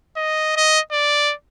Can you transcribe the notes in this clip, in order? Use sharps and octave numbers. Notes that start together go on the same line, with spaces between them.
D#5
D#5
D5